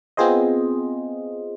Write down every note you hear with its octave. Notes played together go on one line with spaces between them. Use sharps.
B3 C4 F4 G#4 C5 D#5